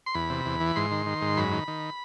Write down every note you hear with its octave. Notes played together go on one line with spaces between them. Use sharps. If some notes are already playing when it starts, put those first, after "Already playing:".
C6
E2 B5
C3
E2
E3
G#2 C6
D#3
D#3
G#2
F#2 B5
D#3
D#3